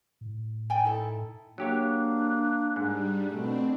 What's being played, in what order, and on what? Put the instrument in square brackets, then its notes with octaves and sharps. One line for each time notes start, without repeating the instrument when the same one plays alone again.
[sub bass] A2
[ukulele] D5 G5 G#5
D#4 E4 A4
[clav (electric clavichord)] F#3 G4 C#5 [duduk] A#3 [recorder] D4
[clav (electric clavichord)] G#2 [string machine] G3
[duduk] B2 [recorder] A3 [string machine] C4 D4